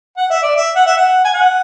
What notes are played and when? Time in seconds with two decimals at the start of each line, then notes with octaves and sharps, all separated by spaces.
0.17 F#5
0.30 E5
0.42 D5
0.56 E5
0.75 F#5
0.86 E5
0.97 F#5
1.24 G#5
1.34 F#5